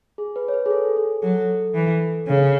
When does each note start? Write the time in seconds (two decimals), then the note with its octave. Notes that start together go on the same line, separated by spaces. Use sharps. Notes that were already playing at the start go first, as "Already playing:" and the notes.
0.18 G#4
0.36 B4
0.48 C#5
0.53 B4
0.66 G#4
0.71 A4
0.97 G#4
1.22 F#3 A4
1.74 E3
2.27 C#3